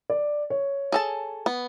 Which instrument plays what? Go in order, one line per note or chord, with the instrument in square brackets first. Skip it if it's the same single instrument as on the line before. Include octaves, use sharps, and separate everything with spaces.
[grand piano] D5
C#5
[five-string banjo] G#4 A4 A5
B3